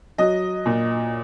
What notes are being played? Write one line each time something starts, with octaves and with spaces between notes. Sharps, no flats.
F#3 D#5
A#2